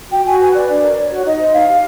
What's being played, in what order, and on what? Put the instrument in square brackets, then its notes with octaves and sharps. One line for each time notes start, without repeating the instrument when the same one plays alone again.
[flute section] F#4 G5
F#4 G#5
B4 G#5
B4 D5
D4
A#4
C#5
F#4
D#4 D#5
C5
D#4 F5
G4